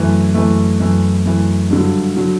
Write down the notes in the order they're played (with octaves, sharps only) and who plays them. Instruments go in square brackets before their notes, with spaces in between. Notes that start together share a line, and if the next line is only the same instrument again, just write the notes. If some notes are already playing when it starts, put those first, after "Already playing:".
Already playing: [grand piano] F#2 E3 A3
F#2 E3 A3
F#2 E3 A3
F#2 E3 A3
G2 D3 F#3
D3 F#3